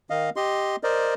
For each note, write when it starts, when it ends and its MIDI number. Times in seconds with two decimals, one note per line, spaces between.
0.10 0.30 51
0.10 0.30 75
0.10 0.30 77
0.36 0.76 67
0.36 0.76 75
0.36 0.76 84
0.83 1.14 70
0.83 1.14 72
0.83 1.14 74
0.83 1.14 75